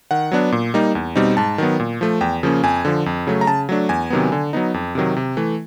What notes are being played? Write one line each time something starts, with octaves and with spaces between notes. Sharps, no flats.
D#3 F#5
F#3 B3 D4
A#2
G3 A#3 D#4
E2
B2 G3 C4 D#4
G#2 A5
D#3 F#3 B3
A#2
F3 A3
E2 G5
C#3 F3 A#3 C#4
F2 G#5
D3 F3
F2
C#3 F#3 A3
A#5
C#3 A5
F#3 A3 D4
E2 G#5
C3 D#3 F#3 B3
D3
F#3 B3 D#4
F2
C3 D#3 F#3
C3
E3 A3